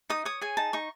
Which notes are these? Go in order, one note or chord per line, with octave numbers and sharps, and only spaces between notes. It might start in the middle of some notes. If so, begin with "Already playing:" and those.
D#4 D#6
C#5 D#6
G#4 G#5
D#4 A5
D#4 C#6